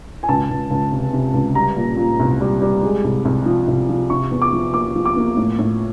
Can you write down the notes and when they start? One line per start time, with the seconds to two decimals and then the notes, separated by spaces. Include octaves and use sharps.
0.23 G#5
0.29 C#2 A5
0.50 C#2
0.70 C#2
0.92 C3
1.13 C3
1.34 C#2
1.55 G3 A#5
1.76 A#2
1.97 A#2
2.19 C2
2.41 G3
2.62 G3
2.83 G#3
3.04 C2
3.25 C2
3.46 F3
3.67 C2
3.89 F3
4.10 C3 C#6
4.31 E2
4.42 D6
4.53 F3
4.74 A#3 D6
4.96 F3
5.05 D6
5.17 A#3
5.37 A2
5.59 A2